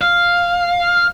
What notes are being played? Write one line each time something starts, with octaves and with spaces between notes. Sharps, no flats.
F5